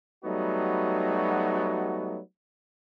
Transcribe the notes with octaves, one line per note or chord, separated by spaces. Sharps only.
F#3 G3 A3 B3 D#4 F#4